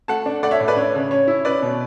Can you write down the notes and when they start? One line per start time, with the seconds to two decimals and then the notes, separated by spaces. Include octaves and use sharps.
0.08 A3 F#5 A5
0.26 D4
0.43 A3 D5 F#5
0.51 C#5 E5
0.60 A2
0.68 B4 D5
0.76 D4 C#5
0.95 C#3
1.11 C#4 C#5
1.28 E4
1.45 C#4 B4 D5
1.62 B2